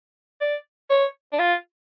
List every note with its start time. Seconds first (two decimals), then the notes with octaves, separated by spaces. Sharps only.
0.41 D5
0.90 C#5
1.33 D4
1.39 F4